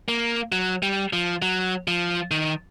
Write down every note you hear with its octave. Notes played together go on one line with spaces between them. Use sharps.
A#3
F#3
G3
F3
F#3
F3
D#3